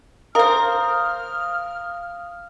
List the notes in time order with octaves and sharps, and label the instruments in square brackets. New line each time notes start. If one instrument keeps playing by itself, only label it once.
[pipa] A#4 C5 [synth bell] F5 D#6 [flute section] F6